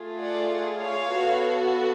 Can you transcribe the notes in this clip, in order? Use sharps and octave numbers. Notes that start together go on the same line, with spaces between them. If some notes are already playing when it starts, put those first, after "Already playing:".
Already playing: A3 F4 G#4
D5 F#5
C#5 F5
B3 F#4 A4